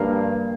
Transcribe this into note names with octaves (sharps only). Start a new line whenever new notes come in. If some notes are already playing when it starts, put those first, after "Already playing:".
Already playing: G2 A#3